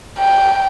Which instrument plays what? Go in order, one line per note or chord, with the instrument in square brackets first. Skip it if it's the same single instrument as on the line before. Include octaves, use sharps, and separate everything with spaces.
[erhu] G5